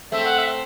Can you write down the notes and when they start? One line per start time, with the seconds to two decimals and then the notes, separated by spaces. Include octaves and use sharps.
0.12 A3 C4 E5
0.25 F#5
0.38 E5